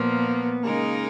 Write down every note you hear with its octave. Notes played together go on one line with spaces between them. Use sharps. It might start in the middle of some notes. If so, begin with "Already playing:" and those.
Already playing: A#2 F3 A#3 B3
C#3 G#3 A#3 D#4 A#4